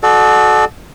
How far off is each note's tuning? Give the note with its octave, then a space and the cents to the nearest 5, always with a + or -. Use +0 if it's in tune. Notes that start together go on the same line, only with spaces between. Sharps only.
F#4 +0 A4 -30 D5 +35